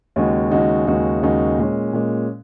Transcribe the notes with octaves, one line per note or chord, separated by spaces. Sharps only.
D#2 C#3 G#3 D#4 F#4
D#2 C#3 G#3 D#4 F#4
D#2 C#3 G#3 D#4 F#4
D#2 C#3 G#3 D#4 F#4
A#2 G#3 C#4
A#2 G#3 C#4